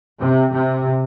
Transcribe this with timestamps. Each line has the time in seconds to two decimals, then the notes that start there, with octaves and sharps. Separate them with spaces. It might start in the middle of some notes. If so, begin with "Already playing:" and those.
0.19 C3
0.53 C3